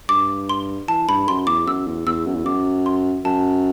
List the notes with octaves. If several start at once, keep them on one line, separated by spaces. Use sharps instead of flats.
G2 D6
C6
E3 A5
G2 B5
F#2 C6
E2 D6
F#2 E6
E2
E2 E6
F#2
E2
F#2 D6
C6
F#2 A5